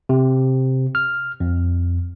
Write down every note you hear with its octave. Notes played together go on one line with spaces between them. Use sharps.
C3
F6
F2